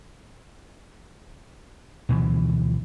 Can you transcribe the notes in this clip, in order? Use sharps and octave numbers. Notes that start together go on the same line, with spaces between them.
D2 B2 E3 F3